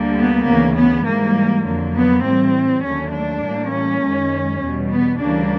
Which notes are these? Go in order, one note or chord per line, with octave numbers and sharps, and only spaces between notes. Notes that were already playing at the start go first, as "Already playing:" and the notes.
Already playing: D2 D3 G3 A#3
B3
D2 C#3 E3 A#3
B3
G#2 E3 G3 A#3
F2 D3 F#3 A#3
B3
A2 E3 G3 C4
D#2 D3 F#3 A3 C#4
D4
A2 E3 G3 A#3
C#4
F#2 D#3 G#3
E2 B2 G3
B3
D2 C#3 E3 G3 A#3 D4